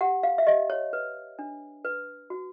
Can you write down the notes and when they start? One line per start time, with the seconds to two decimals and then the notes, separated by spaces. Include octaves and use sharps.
0.01 G4 F#5
0.23 F5
0.38 E5
0.46 G4 D#5
0.70 C#5
0.93 B4
1.39 D4
1.85 B4
2.30 F#4